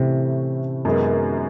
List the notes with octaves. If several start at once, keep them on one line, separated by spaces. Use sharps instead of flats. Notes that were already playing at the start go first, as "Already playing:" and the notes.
Already playing: A2 C3 E3 A3 C#4
F#2 D#3 G#3 B3